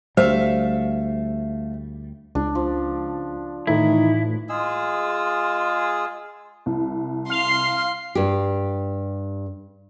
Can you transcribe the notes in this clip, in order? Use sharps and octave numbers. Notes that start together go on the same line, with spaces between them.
D2 G3 A3 C5 E5 F5
C#2 D4
F3
A2 D#3 E3 A3 E4
G#3 F4 G#4 E6
C2
F5 C6
G2 G4